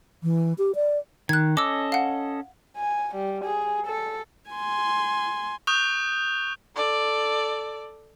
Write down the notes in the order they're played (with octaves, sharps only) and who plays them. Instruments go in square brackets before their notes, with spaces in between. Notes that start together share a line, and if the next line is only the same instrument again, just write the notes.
[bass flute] E3
G4
D5
[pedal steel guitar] D#3 [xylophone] F#6 G#6
[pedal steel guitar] C#4 A4 D#5 [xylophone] D6 E6
[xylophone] F5 F#5
[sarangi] G#5
G3
G#4
A4
[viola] G#5 C6
[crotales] C#6 D#6 F#6 G6 F7
[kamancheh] A4 D5